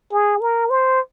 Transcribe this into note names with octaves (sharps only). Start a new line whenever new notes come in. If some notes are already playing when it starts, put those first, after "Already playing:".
G#4
A#4
C5